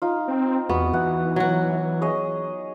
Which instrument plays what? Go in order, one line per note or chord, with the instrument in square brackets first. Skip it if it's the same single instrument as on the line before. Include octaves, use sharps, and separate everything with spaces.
[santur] D#4 F4
[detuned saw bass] C4
[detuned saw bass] E2 [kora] B3 [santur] F#4
[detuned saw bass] E3 [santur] F#5
[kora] F#3 F#4
[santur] G#4 C#5 D#5